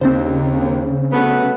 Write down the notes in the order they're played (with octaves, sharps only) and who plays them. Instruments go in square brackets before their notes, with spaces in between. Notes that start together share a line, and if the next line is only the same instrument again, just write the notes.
[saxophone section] D#2 [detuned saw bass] C#3 [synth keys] C4 D4 C5
[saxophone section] F#3 A3 B3